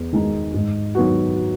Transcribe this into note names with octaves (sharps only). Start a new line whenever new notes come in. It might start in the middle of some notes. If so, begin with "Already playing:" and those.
Already playing: E2
D#3 G#3 D#4
G#2
D#3 F#3 B3 F#4